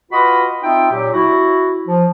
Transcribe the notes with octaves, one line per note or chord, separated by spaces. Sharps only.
F4 F#4 B4 D#5 B5
C4 D#4 F4 E5 G5
A#2 F#3 G4
E4 F#4
F3